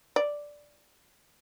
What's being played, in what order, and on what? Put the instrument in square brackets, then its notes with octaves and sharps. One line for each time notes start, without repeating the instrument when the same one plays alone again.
[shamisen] D5